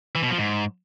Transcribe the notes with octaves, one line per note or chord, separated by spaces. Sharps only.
E3
B2
F3
G#2